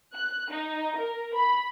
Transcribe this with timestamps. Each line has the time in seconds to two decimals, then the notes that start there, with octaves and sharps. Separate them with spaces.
0.14 F#6
0.50 D#4
0.96 A#4
1.34 B5